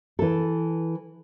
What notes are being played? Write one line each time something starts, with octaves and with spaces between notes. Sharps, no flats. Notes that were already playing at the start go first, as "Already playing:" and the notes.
E3 A4